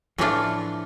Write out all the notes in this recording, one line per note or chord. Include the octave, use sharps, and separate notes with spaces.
A2 E3 F3 A3 D4 F4